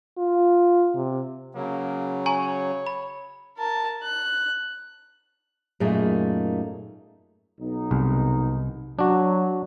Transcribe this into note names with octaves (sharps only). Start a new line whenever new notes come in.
F4
C3
C#3 F#3 A#3
C#5 G#5 A#5 C#6
B5
A#4 A5
F#6
F#2 A#2 A3 A#3 D#4 G#4
B1 B3 D#4
C2
F#3 D4 F#4